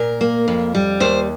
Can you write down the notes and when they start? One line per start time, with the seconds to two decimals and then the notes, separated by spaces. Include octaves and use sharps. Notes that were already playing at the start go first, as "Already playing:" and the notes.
Already playing: A#2 A#4
0.21 A#3
0.48 F2
0.75 G3
1.00 D#2 C5